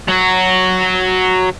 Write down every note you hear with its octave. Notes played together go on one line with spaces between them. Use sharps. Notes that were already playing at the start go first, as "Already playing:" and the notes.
F#3 F#4